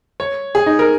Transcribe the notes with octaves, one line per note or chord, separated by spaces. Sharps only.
C#5
G#4
D#4
A#4